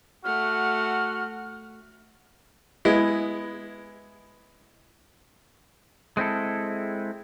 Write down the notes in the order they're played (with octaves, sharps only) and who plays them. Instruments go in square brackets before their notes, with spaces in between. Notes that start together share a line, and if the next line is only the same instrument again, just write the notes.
[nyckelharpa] A3 F#5 [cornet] F#4 [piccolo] F6
[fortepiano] G#3 B3 E4
[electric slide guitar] G#3 C4 E4 A4